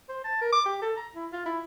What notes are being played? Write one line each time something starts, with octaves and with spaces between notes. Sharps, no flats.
C5
A5
A#4
D6
G4
A4
A#5
E4
F4
E4